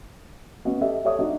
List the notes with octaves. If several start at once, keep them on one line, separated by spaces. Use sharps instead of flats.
B3 C#4 F#4 D#5
G4 A4 D#5 E5
G4 A4 C#5 E5 D#6
D4 D#4 F#4 D5 D#5